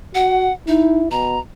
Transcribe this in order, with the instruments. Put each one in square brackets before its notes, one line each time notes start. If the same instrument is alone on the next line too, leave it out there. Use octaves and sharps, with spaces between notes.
[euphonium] F#4 [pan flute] F#5
[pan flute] D#4 [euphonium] E4
[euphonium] B2 [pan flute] A#5